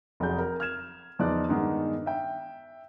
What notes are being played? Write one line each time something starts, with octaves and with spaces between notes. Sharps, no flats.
F1 F#3 G#4 G6
A#4
F6 G#6 E7
E2 F3 D#4 D5 F#6
G2 D#3 G#3 B3 D4 D#4
E5 G5